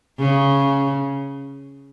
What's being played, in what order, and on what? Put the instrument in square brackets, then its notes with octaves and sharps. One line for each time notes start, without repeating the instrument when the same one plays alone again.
[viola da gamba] C#3